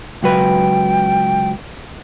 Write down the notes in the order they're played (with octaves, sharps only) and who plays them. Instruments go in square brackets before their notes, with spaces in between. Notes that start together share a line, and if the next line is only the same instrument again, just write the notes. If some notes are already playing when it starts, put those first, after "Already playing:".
[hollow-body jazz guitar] C#2 F#3 B4 [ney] G5